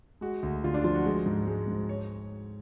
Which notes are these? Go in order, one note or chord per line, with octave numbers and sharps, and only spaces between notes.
G#3 F#4
D2
D3 F4
D4
F3 F4
F#4
G#3
G#2
G#3
G#2
C#5